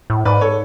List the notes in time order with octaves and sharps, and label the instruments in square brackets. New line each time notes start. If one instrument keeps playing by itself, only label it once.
[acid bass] A2
[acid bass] G#2 [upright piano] B4 D5
[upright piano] A4 C#5